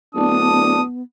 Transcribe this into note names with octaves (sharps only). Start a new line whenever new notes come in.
D1 B3 D4 D#6